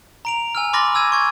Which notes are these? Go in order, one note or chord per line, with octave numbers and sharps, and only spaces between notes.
A#5 D7 F7
G#5 E6 F6
B5 C6 D6 F6 A6 A#6
E6 G#6 D#7
C#6 G#6